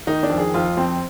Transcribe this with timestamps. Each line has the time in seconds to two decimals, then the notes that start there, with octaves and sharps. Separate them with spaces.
0.07 D#3 D#4
0.23 D4
0.30 F2
0.38 G#4
0.54 F2 F4
0.77 F2 C4